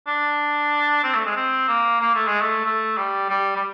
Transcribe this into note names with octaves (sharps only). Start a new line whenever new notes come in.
D4
C4
A3
G#3
C4
A#3
A#3
A3
G#3
A3
A3
G3
G3
G3